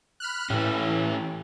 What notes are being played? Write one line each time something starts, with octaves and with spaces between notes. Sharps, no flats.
B5 F6 F#6
A2 E3 C#4 G4